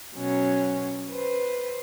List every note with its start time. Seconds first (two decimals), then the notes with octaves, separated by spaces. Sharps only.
0.14 B2 F#3 C#4
1.08 B4 C5